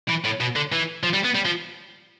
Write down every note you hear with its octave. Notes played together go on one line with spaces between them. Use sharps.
E3
A2
B2
D3
E3
F3
G3
B3
G3
F3